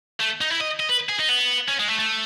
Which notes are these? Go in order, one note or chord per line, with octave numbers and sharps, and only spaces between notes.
A3
D#4
E4
D#5
D#5
B4
G#4
D#4
B3
C#4
G#3
A3
A3